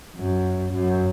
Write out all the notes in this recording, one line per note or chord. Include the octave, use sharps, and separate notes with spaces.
F#2
F#2